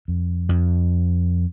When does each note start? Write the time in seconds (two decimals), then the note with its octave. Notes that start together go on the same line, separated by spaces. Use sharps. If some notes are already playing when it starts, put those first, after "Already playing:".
0.08 F2
0.49 F2